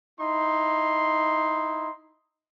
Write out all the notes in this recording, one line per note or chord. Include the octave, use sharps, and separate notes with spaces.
D#4 E4 C6